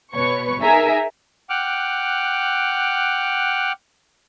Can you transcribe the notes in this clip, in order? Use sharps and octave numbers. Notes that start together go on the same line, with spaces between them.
B2 B4 C#5 C#6
D#4 G#4 A#4 E5 G#5 A#5
F#5 G5 D6 F6 F#6